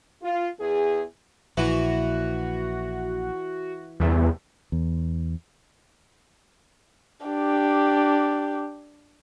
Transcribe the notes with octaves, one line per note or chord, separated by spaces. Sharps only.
F4
E2 G#4
A#1 E3 F#4
E2 G2 C3 A3
E2
D4 G4